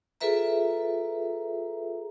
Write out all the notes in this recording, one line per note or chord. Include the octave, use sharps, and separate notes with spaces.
F4 G#4 A4 B4 E5 A#5